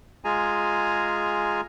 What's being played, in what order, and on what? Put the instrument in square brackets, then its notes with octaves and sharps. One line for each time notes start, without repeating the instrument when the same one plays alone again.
[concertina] G#3 F4 G#4 G#5 A#5